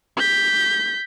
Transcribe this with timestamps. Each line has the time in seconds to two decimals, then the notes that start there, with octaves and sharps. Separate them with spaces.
0.17 G6 B6